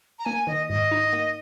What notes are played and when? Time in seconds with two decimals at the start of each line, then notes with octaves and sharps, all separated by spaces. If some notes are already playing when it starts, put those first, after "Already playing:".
0.19 A#5
0.25 A#3 G#5
0.47 D#3 D#5
0.69 G#2 D#5
0.91 D#4
1.13 A#3